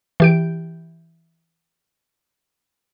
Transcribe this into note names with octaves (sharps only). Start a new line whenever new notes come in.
E3 G4 D7